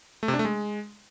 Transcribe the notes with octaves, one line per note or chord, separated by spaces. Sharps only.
A3
C3
D4
A3
G#3